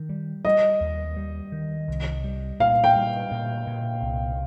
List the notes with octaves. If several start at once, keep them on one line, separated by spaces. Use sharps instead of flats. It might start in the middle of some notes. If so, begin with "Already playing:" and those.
Already playing: D#3
G3
G3 D#5
D#2
G3
D#3
C2
G3
A#2 F5
G5
G3
A#2
A#2
C2